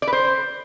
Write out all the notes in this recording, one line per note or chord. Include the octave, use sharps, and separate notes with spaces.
D5
B4
C5